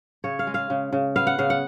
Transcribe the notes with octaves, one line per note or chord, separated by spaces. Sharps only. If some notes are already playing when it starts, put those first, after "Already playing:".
C#3 C#5
F5
G#3
F5
C#3
C#3
B3 F5
F#5
C#3 F5
F#5